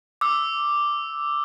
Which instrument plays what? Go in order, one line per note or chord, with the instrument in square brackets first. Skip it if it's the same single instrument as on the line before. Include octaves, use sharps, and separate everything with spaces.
[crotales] D6 E6